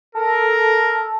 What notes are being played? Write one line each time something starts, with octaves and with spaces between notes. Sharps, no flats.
A4 A#4